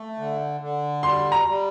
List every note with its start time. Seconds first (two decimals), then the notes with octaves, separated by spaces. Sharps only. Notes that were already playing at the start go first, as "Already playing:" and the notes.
Already playing: A3
0.18 D3
0.61 D3
1.03 G3 C6
1.32 A#5
1.47 G3